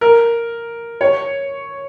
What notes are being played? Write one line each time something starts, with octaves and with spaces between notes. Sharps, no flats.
A#4
C#5